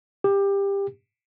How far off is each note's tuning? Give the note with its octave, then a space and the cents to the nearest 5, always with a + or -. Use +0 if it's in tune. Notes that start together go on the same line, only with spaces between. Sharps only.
G4 +20